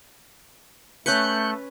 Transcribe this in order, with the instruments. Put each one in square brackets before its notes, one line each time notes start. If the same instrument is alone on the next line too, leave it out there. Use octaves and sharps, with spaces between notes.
[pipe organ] A3 [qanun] C#4 B4 [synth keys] F#6 G6 C#7